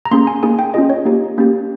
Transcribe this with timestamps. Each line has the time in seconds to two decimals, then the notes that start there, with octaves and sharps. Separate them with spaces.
0.05 A#5
0.11 A#3 C#4 G#4 C6
0.27 G#5
0.43 A#3 D#4 G#4 G#5
0.59 G5
0.74 C#4 F4 G#4 D#5
0.90 C#5
1.05 A#3 D#4 G4
1.38 A#3 C#4 G4